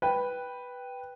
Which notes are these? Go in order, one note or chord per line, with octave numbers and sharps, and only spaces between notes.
B4 G5